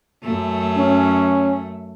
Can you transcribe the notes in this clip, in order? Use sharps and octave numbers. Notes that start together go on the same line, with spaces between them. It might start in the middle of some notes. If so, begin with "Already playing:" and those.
F#2 A3
C#4